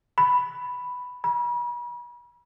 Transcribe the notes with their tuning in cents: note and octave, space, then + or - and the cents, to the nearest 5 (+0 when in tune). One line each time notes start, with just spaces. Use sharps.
B5 +0
B5 -40